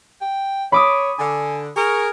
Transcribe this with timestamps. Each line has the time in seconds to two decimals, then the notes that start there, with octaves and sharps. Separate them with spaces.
0.21 G5
0.72 C#5 B5 D6 D#6
1.19 D3 G#5
1.77 G#4 A#4 C#6